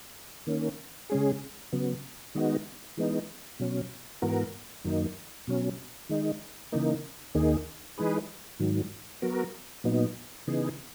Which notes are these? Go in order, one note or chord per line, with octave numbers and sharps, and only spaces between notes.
D#3 A#3 C#4
C#3 G#3 C#4 G#4
C#3 F#3 B3
D#3 G#3 B3 D#4 F#4
E3 G#3 B3 D#4
B2 F#3 C#4
G#2 E3 B3 F#4 A#4
F#2 D#3 F#3 A#3 D#4
B2 F#3 C#4
D#3 G#3 D#4
C#3 E3 A#3 D#4
D#2 D#3 A#3 D#4 G#4
E3 G#3 D#4 G#4 B4
G#2 D#3 F#3
F#3 B3 F#4 A#4
A#2 F#3 B3 D#4
C#3 E3 B3 D#4 G#4